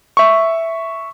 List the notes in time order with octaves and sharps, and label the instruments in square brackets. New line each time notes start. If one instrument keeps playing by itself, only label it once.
[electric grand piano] E5 C#6